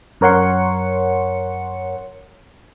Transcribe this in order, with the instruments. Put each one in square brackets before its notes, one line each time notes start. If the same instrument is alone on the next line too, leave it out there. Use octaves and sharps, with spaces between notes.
[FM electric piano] F#2 A#4 C#5 F#5 C6 C#7